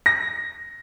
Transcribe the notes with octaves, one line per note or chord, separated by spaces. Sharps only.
A#6